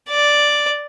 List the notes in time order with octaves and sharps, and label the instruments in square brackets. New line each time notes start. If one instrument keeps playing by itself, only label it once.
[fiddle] D5